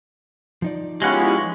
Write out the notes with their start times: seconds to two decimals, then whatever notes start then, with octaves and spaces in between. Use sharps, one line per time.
0.62 F3 D#4 D5
1.02 G#3 B3 C#4 E4 F4 G4 F#5